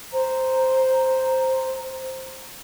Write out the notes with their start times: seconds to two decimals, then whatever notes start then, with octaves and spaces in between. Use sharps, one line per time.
0.11 C5 A#5